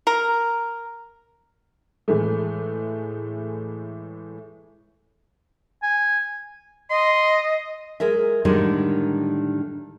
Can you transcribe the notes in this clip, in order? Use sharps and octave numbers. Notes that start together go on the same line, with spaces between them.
A#4
A2 E3 G#3 A3
G#5
D#5 C6
G#3 G#4 A#4 E5
A2 D3 D#3 G3 G#3